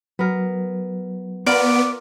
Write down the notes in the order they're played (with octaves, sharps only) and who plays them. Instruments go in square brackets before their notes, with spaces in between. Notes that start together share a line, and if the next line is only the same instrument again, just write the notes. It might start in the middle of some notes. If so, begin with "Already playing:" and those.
[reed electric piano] F#3 [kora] B3 A#4
[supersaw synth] B3 [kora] F4 A#4 [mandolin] D5